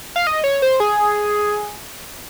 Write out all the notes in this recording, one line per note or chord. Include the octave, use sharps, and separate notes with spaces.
F5
D#5
C#5
C5
G#4